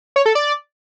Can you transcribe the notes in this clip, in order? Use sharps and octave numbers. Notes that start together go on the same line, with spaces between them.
C#5
A4
D5